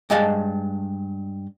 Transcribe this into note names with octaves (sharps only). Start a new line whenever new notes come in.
G2 G#3 D#5 F5 A5